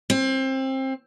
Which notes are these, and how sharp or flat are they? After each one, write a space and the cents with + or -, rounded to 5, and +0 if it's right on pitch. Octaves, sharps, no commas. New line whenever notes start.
C4 +25